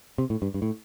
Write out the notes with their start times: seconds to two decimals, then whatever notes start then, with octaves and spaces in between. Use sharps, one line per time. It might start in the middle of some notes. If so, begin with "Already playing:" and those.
0.18 C3
0.30 A2
0.42 G2
0.54 G2
0.62 A2